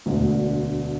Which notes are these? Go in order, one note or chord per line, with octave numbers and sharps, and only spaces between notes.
E1 D2 D3